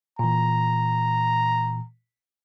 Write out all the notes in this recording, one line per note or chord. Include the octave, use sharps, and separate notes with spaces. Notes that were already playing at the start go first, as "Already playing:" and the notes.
A#2 E3 A#5